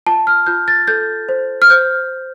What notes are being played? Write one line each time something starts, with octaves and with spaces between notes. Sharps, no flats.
F4 A5
F6
F4 G6
A6
A4 G6
C5
F6
C5 G6